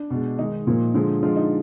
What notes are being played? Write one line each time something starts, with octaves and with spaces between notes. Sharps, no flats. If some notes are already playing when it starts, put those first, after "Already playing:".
Already playing: D4
B2 G#3
D#3 G#3 D#4
A#2 F3 A#3
D3 F3 G#3
D3 F3 G#3 F4
D#4